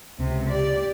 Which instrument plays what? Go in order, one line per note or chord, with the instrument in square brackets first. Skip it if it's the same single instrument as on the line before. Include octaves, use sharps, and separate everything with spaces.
[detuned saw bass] C#2 [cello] C3
[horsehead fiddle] G4 [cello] D5